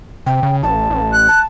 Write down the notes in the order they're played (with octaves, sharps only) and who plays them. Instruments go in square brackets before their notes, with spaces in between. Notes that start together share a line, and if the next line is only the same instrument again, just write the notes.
[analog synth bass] C3 [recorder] G5
[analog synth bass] C#3
[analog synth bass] A1 [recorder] A5
[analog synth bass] A1
[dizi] F#6
[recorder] A5